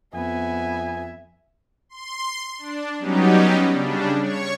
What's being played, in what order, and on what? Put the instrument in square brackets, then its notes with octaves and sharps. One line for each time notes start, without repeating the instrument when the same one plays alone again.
[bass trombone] F2 [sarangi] B3 [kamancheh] E5 [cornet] G#5
[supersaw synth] C6
D4
F#3 G3 B3 C#4 D#4 G4
C#3 G3 D4
C#5 C#6